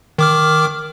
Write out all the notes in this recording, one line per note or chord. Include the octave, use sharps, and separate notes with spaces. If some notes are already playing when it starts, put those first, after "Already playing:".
D#3 D6 F6